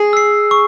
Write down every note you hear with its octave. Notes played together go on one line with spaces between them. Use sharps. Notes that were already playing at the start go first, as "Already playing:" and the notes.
Already playing: G#4
E6 C7
C#6